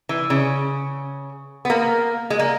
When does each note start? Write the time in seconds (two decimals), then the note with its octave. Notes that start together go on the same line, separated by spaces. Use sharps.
0.09 E3
0.30 C#3
1.65 B3
1.70 A#3
2.30 G#3
2.39 A#3